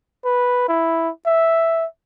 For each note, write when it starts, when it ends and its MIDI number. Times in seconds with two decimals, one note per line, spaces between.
0.25 0.66 71
0.69 1.10 64
1.26 1.85 76